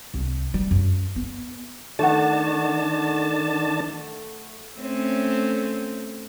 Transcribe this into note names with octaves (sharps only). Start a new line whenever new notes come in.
C2
G3
F#2
B3
D#3 A3 D4 F#5 A5
A3 C4 C#4